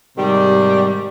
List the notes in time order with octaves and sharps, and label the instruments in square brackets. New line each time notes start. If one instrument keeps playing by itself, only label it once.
[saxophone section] G#2 C3 D#3 G3